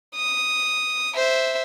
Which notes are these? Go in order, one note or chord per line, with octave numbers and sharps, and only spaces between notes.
D#6
C5 E5